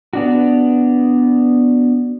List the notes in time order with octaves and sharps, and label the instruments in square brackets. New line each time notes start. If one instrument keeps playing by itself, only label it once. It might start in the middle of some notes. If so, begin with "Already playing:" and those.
[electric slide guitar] B3 D4 F#4